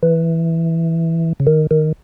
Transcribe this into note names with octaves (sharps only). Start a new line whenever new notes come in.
E3
C#3
D#3
D#3